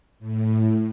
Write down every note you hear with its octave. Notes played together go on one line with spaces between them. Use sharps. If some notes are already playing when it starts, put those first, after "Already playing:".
A2